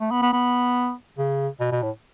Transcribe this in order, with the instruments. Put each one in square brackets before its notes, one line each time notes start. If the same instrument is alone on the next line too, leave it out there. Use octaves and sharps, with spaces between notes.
[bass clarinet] A3
B3
B3
B3
C#3
B2
B2
A2